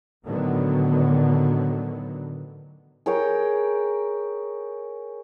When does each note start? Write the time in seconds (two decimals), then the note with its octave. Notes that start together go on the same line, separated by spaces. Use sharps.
0.24 A2 D3 D#3 F#3 B3
3.06 G#4 A#4 C#5 G5